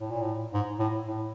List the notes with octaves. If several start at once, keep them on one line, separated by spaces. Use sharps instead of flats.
A2
A#2
A2
G#2
A2
A2